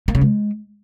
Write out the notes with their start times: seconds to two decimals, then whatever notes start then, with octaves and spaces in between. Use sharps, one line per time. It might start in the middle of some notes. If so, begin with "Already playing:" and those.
0.08 A#3
0.15 C#3
0.21 G#3